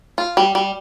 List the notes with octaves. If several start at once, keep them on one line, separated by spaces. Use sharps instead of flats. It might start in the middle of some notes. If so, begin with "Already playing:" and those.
F4
G3
G3